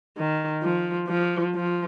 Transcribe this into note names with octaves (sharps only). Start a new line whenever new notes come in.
D#3
F3
F3
F3